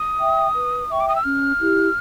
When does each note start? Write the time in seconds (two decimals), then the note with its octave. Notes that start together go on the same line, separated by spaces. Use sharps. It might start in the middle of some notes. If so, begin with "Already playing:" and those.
Already playing: D#6
0.18 E5 G5
0.54 B4
0.89 E5 G5 C#6
1.00 D6
1.08 D#6
1.16 E6
1.23 C#4 F6
1.59 E4 G4